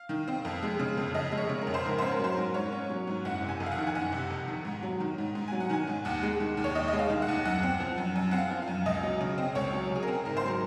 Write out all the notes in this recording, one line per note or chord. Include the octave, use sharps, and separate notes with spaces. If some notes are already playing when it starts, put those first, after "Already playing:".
Already playing: F5
D#3
C4
F2
G#3
C#3
F2
F2 D#5
G#3
C#5
C#3
A#4
F2
C5
G#2 A#4
C#4 C5
A#4
F#3 C5
G#2 A#4
G#2 C#5
C#4
F#3
G#2
F#1 F#5
C3
G#5
F2
F5
F#5
D#3
G#5
F#1 F#5
C3
F2
D#3
G#2
F#3
D#3
G#2
G#2
F#3 G#5
F#5
D#3 G#5
G#2
D#2 F#5
G#3
D#3
D#2
C#5
D#2 D#5
D#5
G#3
F5
D#3
F#5
D#2
F#2 F#5
C4
F3
F#2
F#2
C4 F#5
F5
F3
F5
F#2
C#2 D#5
F#3
C#3
C4
C#2 C#5
F#3
C#3 G#4
A#4
C4
G#1 A#4
C5
F#3 A#4